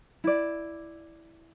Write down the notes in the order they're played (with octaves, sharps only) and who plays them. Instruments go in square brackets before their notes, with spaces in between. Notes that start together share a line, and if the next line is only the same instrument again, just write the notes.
[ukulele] E4 D5